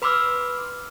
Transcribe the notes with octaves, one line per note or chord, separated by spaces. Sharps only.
B4 B5 C6 D6 E6 F6